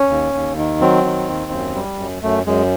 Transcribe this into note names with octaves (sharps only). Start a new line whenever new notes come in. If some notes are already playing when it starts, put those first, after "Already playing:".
Already playing: C#4
D#2
D#2
D#3
F#3 C4
D#3
D#2
F#2
G3
F#2
F#2 A3
F#2 G#3